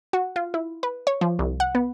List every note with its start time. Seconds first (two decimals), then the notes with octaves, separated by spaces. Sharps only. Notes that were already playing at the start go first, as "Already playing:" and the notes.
0.13 F#4
0.36 F4
0.54 E4
0.83 B4
1.07 C#5
1.21 F3
1.39 C2
1.60 F#5
1.75 B3